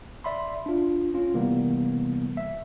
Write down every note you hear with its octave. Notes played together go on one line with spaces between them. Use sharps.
D5 E5 B5 C6
D4 F4
C#4 F4
C3 E3 G3 A#3 B3
E5